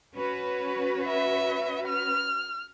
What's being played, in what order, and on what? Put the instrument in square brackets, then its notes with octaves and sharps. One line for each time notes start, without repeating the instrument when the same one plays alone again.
[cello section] C#4 F#4 B4
[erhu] E5
F6